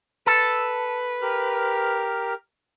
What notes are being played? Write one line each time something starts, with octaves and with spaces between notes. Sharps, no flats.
A4 B4
G4 A#4 F6